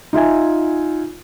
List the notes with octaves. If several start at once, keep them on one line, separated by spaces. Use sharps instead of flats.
D#4 F4 E5 G#5